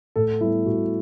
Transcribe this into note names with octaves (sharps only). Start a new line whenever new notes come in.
A2 A4
G3 B3 E4
A2 F#4